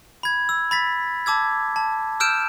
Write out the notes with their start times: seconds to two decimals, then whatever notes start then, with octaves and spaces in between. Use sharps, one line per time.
0.23 B5 G#6
0.49 E6
0.71 B5 A6 B6
1.26 A5 D6 E6 G#6
1.76 A5
2.20 E6 F6 G6 D7 E7